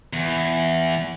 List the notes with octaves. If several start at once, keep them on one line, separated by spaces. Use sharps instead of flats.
E2